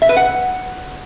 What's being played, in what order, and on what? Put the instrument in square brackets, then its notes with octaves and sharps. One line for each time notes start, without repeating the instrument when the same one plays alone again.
[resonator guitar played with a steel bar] E5
B4
F#5